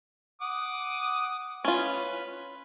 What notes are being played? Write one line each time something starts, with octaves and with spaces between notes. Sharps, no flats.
F#5 D6 D#6
C#4 F4 B4